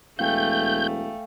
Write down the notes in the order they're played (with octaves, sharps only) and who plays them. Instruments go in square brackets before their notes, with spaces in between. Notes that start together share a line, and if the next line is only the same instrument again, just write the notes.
[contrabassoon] E1 [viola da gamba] A3 [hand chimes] F5 G5 G#5 [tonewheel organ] G6